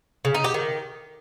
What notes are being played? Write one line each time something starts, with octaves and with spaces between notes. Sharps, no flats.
C#3
D#4
G4
D#3